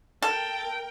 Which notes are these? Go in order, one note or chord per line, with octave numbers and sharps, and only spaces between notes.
A4 A#4 G5